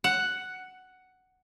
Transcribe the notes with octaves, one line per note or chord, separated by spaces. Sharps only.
F#5